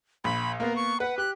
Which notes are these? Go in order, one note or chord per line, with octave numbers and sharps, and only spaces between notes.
A#1 B5
A#3 B3 A#4
C#6
B4 F#5
G4 F#6